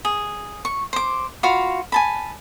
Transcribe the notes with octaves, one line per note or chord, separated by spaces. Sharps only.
G#4
C#6
C5 D6
F4 F#4 F5 B5
G#5 A5 B5